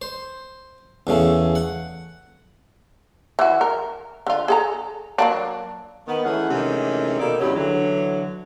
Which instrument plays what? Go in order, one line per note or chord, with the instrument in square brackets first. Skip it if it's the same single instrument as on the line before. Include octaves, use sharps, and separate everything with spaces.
[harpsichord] C5
E2 C#3 A3
F#5
[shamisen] E3 F#4
A#4
D3 F4
G#4 A4 A#5
F#3 A#3 D4
[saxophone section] D#3 B3
E3 A3 C#4 G#4 C#5 F#5
C3 D#3 E3 G#3 A3 C#4
B2 A#3 D#4 G4 A4 D5
E2 C#3 F#3 G3 D4 G4
D3 E3 F#3